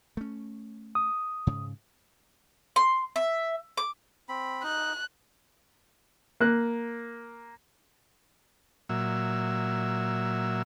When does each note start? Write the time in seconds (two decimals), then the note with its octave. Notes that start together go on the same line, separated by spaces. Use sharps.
0.17 A3 C#4
0.95 D#6
1.47 G#2 C#3
2.76 C6
3.16 E5
3.77 D6
4.29 C4 B5
4.63 D#4 F#6
6.40 A#3 F#6
8.89 A#2 F#3 E5